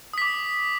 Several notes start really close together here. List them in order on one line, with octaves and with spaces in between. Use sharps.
D#6 B6 D6